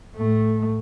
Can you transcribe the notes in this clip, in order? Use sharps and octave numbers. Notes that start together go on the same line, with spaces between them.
A2 A3